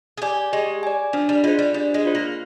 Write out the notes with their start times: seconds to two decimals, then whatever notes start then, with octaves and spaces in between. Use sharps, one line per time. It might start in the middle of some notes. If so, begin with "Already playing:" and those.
0.17 G#4
0.22 G4 D5 G#5
0.53 G#3 G4
0.83 D5 G#5
1.13 F3 D4
1.29 G3
1.44 G#3 F4 C5
1.59 G3
1.74 G3 D4
1.94 G#3
2.05 F4 C5
2.15 A#3